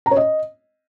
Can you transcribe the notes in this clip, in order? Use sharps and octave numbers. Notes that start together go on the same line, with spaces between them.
A#5
C#5
D#5